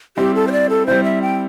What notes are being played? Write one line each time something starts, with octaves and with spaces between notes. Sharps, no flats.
G3 C4 E4 G4
A4
C5
D5
A4
G3 C4 E4 C5
E5
G5